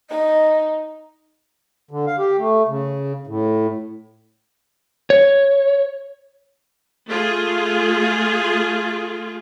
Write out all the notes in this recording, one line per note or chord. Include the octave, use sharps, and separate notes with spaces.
D#4 D#5
D3
F5
G4
A3
C#3
A2
C#5
A3 F4 G#4